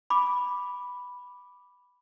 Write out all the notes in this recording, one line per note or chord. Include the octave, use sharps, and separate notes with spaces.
B5 D6